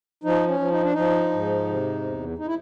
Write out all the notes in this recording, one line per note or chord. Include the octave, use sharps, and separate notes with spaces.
F3 D#4
C#4
F3
D#4
D4
F3 D#4
G#2
C3
E2
D#4
E4